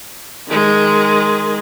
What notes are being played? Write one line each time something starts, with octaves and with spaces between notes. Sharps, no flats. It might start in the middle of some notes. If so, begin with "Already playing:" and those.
D#3 G#3